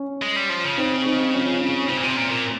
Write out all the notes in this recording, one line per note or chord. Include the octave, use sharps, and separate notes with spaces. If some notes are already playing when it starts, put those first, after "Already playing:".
Already playing: C#4
G#3
G3
F3
C#3
C4 D#4
C4 D#4
C#4 F4
C#4
C#4
C#3 C4
A#2
C3
A#2
A#2